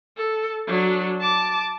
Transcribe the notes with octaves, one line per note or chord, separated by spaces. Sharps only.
A4
F#3 D4
A5 D6